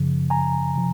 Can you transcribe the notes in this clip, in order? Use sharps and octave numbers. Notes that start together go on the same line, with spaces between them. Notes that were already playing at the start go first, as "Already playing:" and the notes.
Already playing: F#2 C#3 F3
G#5 A#5
C3 F3